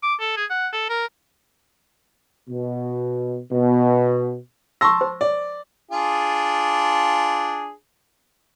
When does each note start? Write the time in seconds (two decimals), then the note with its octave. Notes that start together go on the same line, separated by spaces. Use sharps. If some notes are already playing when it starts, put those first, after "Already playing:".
0.03 D6
0.21 A4
0.37 G#4
0.50 F#5
0.73 A4
0.89 A#4
2.50 B2
3.51 B2
4.81 A5 C6 C#6 E6 A#6
5.01 C5
5.21 D5
5.91 D4 F4 G#4